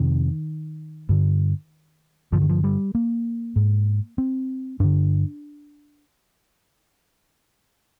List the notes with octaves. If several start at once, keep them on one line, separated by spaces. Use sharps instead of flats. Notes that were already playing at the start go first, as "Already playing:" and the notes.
Already playing: F2 C3 D#3
G2 D3
G2 D3 F3
D#3
F3
G3
A#3
G#2
C4
G2 D3 D4